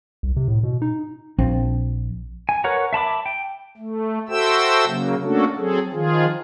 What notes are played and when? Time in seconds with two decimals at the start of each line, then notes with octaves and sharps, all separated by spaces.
0.23 C2
0.36 C3
0.48 A2
0.63 B2
0.82 D#4
1.39 A#1 F3 C4
2.49 G#5
2.64 A#4 B4 C#5 F#5 A#5
2.93 E5 A5 B5 D6
3.26 G5
3.77 A3
4.29 F#4 A4 C5 E5 G5 E6
4.86 C#3 F#3 A#3
5.23 A3 A#3 C#4 D4 F#4 A4
5.57 F#3 C4 G#4 A4
5.92 D#3 F3 F4 G#4